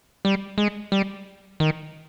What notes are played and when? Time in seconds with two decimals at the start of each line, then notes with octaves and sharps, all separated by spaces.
0.25 G3
0.58 G#3
0.92 G3
1.60 D#3